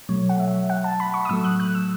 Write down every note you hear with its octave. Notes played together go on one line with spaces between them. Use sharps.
B2 F#3 A3 C#5
F#5
E5
F#5
A5
B5
C#6
D#6
A2 F#3 A3 E6
F#6
F#6
E6